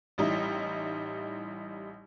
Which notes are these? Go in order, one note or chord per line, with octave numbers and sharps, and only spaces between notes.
A1 G3 D#4 E4